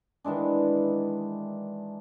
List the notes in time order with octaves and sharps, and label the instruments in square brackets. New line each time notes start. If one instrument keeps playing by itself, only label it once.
[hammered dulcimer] D#3 E3 G#3 D4